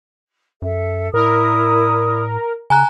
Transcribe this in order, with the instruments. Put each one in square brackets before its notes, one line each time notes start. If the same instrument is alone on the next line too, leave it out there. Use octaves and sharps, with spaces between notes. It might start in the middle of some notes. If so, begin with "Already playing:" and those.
[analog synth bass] F#2 [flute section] A4 E5
[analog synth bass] A2 [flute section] E4 D5 D#6 [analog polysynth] A#4
[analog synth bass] C#3 [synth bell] G#5 A#5 F#6